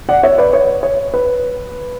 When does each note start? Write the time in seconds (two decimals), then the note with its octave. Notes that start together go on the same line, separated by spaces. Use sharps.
0.09 D5 F#5
0.23 C#5 E5
0.38 B4 D5
0.53 C#5
0.83 C#5
1.14 B4